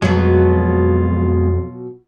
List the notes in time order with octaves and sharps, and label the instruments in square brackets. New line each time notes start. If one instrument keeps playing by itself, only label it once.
[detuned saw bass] F2 [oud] B2 F#3 [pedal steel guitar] G#3 B3 [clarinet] F4